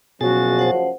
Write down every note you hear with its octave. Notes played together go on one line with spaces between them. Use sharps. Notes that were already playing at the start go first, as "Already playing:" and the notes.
F#1 F#2 B2 F3 F#4 G#4 A6
C5 F#5